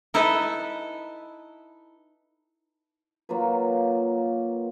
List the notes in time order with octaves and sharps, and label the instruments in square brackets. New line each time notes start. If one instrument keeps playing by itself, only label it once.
[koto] D#4 E4 A4 B4 D#5 E5
[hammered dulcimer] F#3 A#3 F4 B4